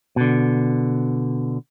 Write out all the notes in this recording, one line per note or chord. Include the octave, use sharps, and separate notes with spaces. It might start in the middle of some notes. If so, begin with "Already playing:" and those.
B2 D3